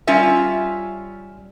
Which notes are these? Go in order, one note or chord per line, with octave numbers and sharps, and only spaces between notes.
G3 C#4 F4 E5